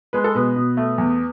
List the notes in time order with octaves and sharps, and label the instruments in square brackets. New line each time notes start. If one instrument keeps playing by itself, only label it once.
[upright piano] G#3 B4
A4
B2 B4
B2
A3
E2